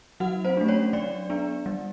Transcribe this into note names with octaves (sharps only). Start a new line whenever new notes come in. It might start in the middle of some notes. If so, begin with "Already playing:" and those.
F#3 F#4 F#5
C4 C5
A3 D4
C#4 C#5
F#3 D4 D5
B3 D4
G3